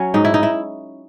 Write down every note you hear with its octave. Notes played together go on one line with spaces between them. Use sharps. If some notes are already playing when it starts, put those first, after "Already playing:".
Already playing: F#3 C#4
G#2 D#4
E4
D#4
E4